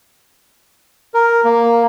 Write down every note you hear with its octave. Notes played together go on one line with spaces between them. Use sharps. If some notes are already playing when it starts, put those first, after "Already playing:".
A#4
A#3